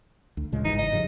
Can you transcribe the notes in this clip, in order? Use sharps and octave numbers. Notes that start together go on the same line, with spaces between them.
D2
A#2 C#3 G#3
G1 G#2 E3 D#4
D#5
G2 C#3 F3